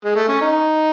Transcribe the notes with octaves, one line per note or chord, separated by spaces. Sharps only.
G#3
A3
C#4
D#4